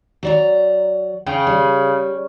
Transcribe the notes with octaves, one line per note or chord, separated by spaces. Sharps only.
F#3 D5 A#5
C#3 G5
G3